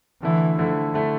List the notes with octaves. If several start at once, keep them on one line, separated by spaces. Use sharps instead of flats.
D3 E3 A3 E4
D3 F3 A3 E4
D3 A3 E4